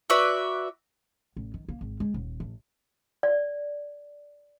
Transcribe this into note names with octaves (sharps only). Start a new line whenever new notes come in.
F#4 B4 D5 E5
A1
D#3
A#3
G#1
G#3
D#1
A1
D5